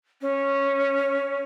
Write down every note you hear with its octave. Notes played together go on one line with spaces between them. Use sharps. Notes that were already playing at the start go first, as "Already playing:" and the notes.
C#4